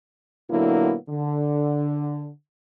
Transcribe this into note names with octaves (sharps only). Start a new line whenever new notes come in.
A#2 D3 F#3 A#3 B3 E4
D3